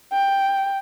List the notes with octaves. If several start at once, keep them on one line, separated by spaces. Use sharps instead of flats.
G5